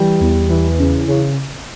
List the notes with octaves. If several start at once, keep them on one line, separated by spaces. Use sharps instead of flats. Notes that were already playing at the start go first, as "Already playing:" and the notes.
Already playing: E3 G3
E2
E3
C#3
C#3